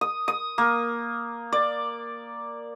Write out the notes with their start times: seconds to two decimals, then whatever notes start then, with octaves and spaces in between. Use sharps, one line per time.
0.01 D#6
0.28 D#6
0.58 A#3
1.52 D5